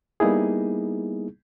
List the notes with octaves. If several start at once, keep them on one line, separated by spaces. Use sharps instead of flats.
G3 A#3 B3 D#4 E4 G#4